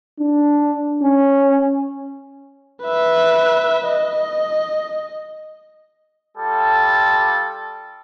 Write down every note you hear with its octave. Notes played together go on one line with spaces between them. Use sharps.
D4
C#4
B4 E5
D#5
G3 F4 A4